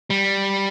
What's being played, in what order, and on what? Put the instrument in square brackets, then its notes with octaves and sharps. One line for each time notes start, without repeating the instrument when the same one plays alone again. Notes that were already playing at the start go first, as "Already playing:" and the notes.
[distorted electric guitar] G3